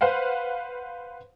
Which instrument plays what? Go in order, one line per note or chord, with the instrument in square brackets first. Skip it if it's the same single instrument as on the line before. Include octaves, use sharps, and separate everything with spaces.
[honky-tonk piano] B4 C5 F5 F#5